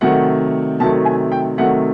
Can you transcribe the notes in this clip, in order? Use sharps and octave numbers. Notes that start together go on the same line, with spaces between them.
C3 D#3 F#3 A3 F#5
C3 D#3 F#3 A3 A5
G#5
G5
C3 D#3 F#3 A3 F#5